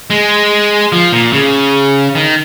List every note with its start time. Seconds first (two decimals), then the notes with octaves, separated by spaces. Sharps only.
0.10 G#3
0.92 F3
1.12 A#2
1.33 C#3
2.15 D#3